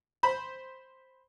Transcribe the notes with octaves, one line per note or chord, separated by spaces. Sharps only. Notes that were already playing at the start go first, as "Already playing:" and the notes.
C5 B5